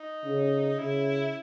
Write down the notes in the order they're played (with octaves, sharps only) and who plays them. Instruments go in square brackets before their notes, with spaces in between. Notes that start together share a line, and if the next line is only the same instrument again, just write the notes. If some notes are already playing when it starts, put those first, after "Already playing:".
Already playing: [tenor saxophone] D#4
[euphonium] C#3
[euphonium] C#3 [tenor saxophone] E4